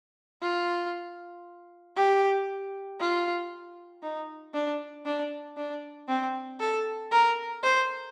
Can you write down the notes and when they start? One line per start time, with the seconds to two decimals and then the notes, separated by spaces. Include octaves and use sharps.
0.42 F4
1.96 G4
3.00 F4
4.02 D#4
4.54 D4
5.05 D4
5.57 D4
6.08 C4
6.60 A4
7.11 A#4
7.63 C5